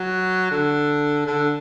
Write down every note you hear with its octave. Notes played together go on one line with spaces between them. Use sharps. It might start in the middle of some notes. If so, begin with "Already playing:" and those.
Already playing: F#3
D3
D3